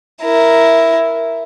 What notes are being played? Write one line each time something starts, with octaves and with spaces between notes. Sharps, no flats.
E4 A#4